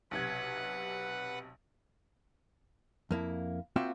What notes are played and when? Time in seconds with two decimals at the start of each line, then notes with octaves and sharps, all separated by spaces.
0.11 B1 C3 B4 F#5 G#6
3.11 F2 A#3 E4
3.76 A#3 C4 F4 F#4 E5 G5